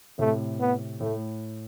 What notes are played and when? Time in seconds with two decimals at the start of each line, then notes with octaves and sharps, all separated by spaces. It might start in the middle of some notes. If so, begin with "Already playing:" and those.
0.19 A2 C3 A3
0.60 B3
1.00 A2 A3